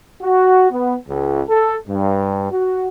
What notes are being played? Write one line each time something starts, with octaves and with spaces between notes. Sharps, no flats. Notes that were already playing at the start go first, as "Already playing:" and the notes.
F#4
B3
C#2
A4
G2
F#4